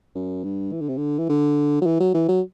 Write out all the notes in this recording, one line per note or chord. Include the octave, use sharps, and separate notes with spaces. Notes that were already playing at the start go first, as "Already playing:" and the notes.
F#2
G2
E3
D3
C3
D3
E3
D3
F#3
E3
F#3
E3
F#3